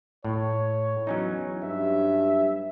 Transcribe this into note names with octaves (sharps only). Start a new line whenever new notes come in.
A2 C#5
E2 F#3 C#4 D#4
G2 E5